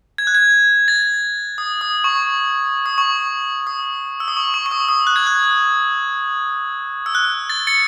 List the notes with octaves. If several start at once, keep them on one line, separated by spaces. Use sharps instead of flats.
G#6
F#6
G#6
A6
D#6
D#6
C#6
D#6
C#6
D#6
E6
D#6
C#6
C#6
C#6
D#6
D#6
F#6
G#6
F#6
E6
F#6
A6
A6 C#7